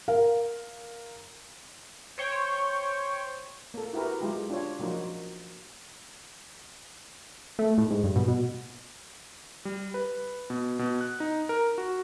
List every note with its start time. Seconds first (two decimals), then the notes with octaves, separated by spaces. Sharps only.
0.08 A#4 F5
2.18 C5 C#5 G5
3.74 A#3 A4
3.93 E4 F#4 G4 A#4 B4
4.20 F#3 G#3 E4 F4 G4
4.50 D4 F4 C#5
4.80 F3 F#3 A#3 D#4 F4 F#4
7.59 A3
7.78 A2
7.91 G#2
8.04 G2
8.16 B2
8.28 B2
9.65 G3
9.94 B4
10.50 B2
10.79 B2
11.01 F#6
11.20 D#4
11.49 A#4
11.78 F#4